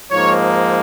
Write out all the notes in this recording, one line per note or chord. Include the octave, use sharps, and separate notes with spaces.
G#2 F3 A#3 D#4 C#5